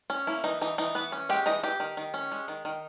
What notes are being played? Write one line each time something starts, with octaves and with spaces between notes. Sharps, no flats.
C#4
A#3 E4
E3 D#4
E3 D#4
E3 D#4
E3 B3 B4
C#4
G#3 G4 G5
E3 D#4 D#5
E3 G4 G5
D#3
D#3
C#4
G#3
D#3
D#3